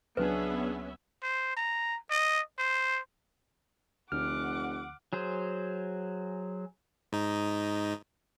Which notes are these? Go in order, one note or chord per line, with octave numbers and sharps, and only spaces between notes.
C#2 F#3 B3 C#4 D4 G#4 B4 E5
C5
A#5
D#5
C5
F1 D2 F#5 D6 F6
F#3 G#4 C5
G#2 D#4